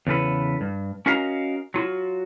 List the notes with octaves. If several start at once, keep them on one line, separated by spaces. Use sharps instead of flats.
E2 C#3 A4 B4
G2
C#4 F#4 A#4 D#5 F5 A#5
F#3 F4 F#4